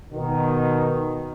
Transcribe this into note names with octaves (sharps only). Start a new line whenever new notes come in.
B2 D#3